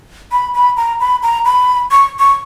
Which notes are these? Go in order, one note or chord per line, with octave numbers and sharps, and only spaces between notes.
B5
B5
A#5
B5
A#5
B5
C#6
C#6